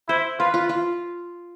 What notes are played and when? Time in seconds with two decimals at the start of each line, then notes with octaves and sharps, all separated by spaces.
0.08 E4 C5
0.39 F4 B4
0.54 F4
0.69 F4